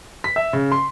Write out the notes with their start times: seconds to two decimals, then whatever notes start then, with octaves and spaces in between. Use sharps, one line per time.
0.24 B6
0.36 E5
0.53 C#3
0.72 C6